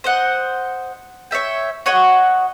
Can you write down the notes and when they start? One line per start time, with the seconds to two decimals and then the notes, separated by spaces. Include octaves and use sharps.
0.04 C5 D#5 F#5
1.31 C#5 D5 E5 G5
1.86 F#4 C#5 D#5 F#5